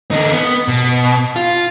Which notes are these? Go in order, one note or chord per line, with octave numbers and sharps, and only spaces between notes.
D3 D#4
B3
B2
F4